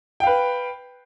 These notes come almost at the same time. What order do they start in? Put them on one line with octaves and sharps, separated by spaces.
G5 F5 B4